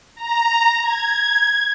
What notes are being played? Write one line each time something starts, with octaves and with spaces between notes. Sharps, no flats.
A#5
G#6